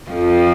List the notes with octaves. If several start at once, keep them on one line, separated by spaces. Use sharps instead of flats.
F2 F3